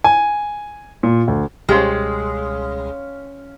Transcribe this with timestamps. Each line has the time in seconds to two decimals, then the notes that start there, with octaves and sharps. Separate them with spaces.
0.04 G#5
1.03 A#2
1.28 D2
1.69 C#2 B2 G3 G#3 C#4 G4 F5 C6